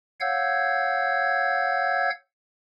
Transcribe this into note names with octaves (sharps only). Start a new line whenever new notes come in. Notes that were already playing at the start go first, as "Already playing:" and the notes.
C#5 F5 F#5 E6 G6 G#6